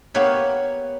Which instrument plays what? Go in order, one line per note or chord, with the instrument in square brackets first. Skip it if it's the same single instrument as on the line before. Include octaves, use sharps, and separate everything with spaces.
[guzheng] A#3 B3 G4 C#5 E5